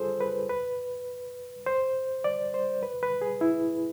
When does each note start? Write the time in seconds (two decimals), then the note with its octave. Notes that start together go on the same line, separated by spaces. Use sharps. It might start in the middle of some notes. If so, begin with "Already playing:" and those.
Already playing: F4 G#4 A4 C5
0.21 B4
0.49 B4
1.67 C5
2.24 D5
2.54 C5
2.83 B4
3.03 B4
3.21 G#4
3.41 E4